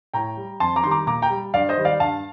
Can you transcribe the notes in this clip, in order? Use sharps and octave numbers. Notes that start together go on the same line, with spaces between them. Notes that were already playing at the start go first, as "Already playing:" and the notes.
A2 G5 A#5
G3
F2 A5 C6
A#5 D6
D#3 G3 C6
A#5 D6
A#2 A#5 D6
G5 A#5
G3
G2 D5 F5
C5 D#5
D#3 G3
D5 F5
G2 F5 A5